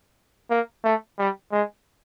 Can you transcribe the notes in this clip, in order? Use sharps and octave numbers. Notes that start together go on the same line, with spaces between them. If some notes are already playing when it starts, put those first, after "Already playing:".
A#3
A3
G3
G#3